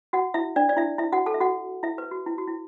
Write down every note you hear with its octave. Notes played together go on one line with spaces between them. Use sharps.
F#4 F#5
E4 E5
D4 D5
D5
E4 E5
E4 E5
F#4 F#5
A4 A5
E5
F#4 F#5
E4 E5
B4
F#4
E4
F#4
E4